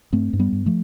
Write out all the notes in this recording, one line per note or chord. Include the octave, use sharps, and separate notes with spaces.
G2 A3 C4
G2
G3 B3
G2
F3 A3